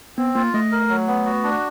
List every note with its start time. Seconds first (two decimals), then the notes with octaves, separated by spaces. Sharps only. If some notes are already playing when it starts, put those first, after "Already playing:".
0.18 B3 C4
0.35 A#3 F4
0.54 A3 D#5
0.72 A#4
0.89 F#3
1.07 B3
1.25 F#4
1.44 D4